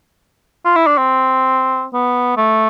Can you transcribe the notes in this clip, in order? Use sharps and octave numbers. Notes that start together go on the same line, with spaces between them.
F4
E4
D4
C4
B3
A3